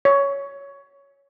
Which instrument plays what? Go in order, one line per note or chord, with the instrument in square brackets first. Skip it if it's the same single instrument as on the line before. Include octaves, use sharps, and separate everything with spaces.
[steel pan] C#5